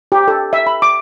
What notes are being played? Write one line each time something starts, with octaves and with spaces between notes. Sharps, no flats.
G4
A4
E5
B5
D6